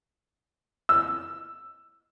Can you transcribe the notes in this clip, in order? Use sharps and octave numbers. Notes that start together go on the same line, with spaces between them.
E6